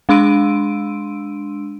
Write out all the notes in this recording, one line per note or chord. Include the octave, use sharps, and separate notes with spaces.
G#3 D4 C6 E6 D7 D#7